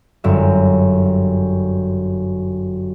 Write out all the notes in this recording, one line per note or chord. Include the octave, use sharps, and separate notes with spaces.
G1 F#2 E5